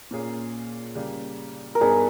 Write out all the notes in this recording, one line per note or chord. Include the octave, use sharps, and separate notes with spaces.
A#2 A#3 C#4 G#4
C#3 G3 A#3
A#4
G2 G3 B3 D#4 G#4